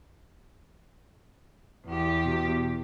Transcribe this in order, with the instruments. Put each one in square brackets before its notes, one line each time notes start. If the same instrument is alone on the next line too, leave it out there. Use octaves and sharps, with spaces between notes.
[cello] E2 G4
[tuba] B2